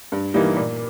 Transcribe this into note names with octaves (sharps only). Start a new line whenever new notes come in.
G2
E3 G3 A#3 D#4
A#2